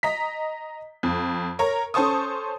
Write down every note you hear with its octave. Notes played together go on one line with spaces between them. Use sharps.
D#5 A#5 B6
F2
A#4 C#5 A#5
C#4 A4 C5 A5 C#6 D#6